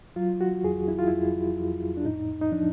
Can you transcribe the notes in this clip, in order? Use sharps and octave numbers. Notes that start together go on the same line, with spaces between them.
F#3 F4
F#4
F2 G#4
E4
F4
F2 E4
F2
D4
A2 D#4
D#4
F3 D4